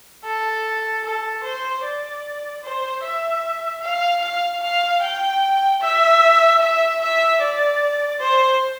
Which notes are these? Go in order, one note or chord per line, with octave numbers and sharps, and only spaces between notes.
A4
A4
C5
D5
C5
E5
F5
F5
F5
G5
E5
E5
E5
D5
C5